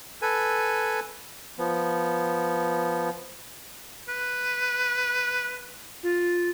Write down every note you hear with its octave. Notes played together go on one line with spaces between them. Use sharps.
A4 B4 G#5
F3 B3
B4
F4